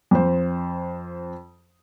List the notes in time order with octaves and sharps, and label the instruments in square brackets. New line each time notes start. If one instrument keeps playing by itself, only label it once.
[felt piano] F2 C5